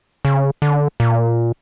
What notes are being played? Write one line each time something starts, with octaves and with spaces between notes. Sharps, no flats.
C#3
D3
A#2